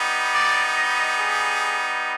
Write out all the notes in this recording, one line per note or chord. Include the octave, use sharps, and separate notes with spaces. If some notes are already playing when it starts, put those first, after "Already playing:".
Already playing: G3 B3 D#4
D5
D#5
G#4